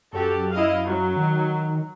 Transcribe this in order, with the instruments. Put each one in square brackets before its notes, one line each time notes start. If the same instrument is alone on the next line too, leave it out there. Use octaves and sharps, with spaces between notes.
[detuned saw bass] F#2 [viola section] F#4 G4 A4
[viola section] E4 D#5 F5
F#3
[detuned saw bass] D#3